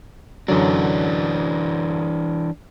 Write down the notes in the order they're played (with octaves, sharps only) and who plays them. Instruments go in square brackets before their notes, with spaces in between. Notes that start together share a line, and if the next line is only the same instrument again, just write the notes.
[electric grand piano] F#2 D3 F#3 [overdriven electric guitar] E3 D4